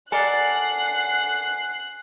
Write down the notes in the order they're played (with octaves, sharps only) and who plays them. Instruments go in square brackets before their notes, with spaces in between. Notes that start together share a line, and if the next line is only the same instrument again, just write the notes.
[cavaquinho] A4 A#4 D5 [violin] F#5 C7 [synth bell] G#5 [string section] F#6